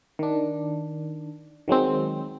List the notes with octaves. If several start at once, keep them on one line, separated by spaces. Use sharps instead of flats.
D#3 D4
D#3 F#3 G#3 C4